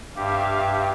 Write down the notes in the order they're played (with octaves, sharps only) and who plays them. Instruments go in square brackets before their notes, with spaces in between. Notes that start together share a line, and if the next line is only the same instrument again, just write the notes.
[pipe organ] G2 G4 [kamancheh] E5 F5